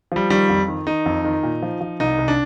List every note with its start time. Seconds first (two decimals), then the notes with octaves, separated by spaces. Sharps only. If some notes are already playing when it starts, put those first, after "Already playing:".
0.12 F3 G3
0.30 D#3 G3
0.50 F2
0.68 D#3
0.87 D#3 D#4
1.06 F2
1.25 D#3
1.43 A#2
1.62 F3
1.81 F3
2.00 C2 D#4
2.19 C2
2.28 D4